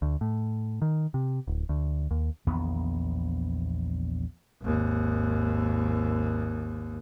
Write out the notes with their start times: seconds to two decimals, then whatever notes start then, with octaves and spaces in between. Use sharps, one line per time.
0.02 D2
0.21 A2
0.82 D#3
1.14 C3
1.47 D1
1.69 D2
2.11 D#2
2.47 A#1 E2 D#3 B3
4.62 G#1 D#2